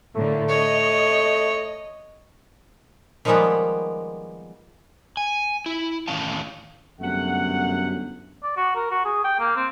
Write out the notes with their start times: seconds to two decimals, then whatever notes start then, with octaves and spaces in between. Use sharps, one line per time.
0.15 A2 D3 A3 A#3
0.49 C#5 D#5
3.25 D#3 F3 G3 G#3 A#3 B3
5.17 G#5
5.66 E4
6.08 E2 A2 D#3 C#4 F5 A5
7.01 G1 F#2 C3 A3 F#5
8.43 D5
8.57 F#4
8.76 A#4
8.91 F#4
9.05 G#4
9.24 G5
9.40 A#3
9.56 C4